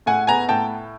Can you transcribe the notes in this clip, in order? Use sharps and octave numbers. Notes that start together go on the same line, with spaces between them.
A2 F#5 G#5
B3 G#5 A#5
A2 G5 A5